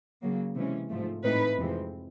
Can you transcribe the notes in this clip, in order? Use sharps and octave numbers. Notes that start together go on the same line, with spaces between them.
C#3 F#3 A#3
C3 E3 G#3 C#4
G#2 F3 A3
A2 E3 A3 C4 D#4 B4
F2 C3 E3 G#3 C4